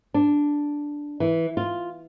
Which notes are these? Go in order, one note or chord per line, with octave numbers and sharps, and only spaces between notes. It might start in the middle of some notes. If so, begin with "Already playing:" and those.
D4
E3
F4